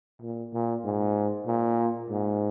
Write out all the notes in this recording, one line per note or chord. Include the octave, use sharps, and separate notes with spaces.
A#2
A#2
G#2
A#2
G#2